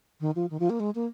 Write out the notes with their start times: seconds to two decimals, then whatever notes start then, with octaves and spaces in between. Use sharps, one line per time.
0.21 D#3
0.36 F3
0.50 D#3
0.60 F3
0.70 A#3
0.80 G#3
0.95 A#3